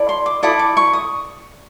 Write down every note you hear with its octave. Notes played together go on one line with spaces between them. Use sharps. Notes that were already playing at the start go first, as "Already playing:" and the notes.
Already playing: E4 A4 D5
C6
D6
E4 A4 D5 D#6
D6
C#6
D#6